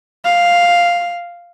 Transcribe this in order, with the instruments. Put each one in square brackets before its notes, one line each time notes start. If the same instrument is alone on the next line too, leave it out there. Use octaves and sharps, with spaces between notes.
[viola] F5